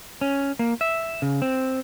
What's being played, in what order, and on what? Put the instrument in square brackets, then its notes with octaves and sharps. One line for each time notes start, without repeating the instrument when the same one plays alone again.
[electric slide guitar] C#4
A#3
E5
C#3
C4